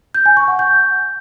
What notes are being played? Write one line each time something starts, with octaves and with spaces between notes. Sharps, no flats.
G6
G#5
C#6
F#5
G6